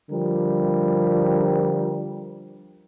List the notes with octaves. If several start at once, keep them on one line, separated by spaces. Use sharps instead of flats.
D3 F3 G3 A#4